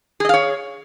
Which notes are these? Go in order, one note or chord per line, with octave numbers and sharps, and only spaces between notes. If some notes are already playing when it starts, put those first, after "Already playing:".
G#4 C#5 D#5 F5